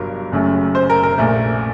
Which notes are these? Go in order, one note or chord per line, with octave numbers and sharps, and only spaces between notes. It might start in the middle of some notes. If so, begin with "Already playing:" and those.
Already playing: G1 G2 F#3 A#4
F#1 F#2 F#3 A3
C5
A#4
A#4
A#1 A#2 A3